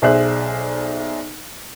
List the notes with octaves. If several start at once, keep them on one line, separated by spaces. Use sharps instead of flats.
B1 G#4 C5 D5 E5 F#6